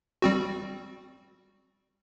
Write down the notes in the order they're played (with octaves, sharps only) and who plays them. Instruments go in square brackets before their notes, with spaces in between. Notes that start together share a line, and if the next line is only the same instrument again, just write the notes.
[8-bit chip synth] G3 C4 F#4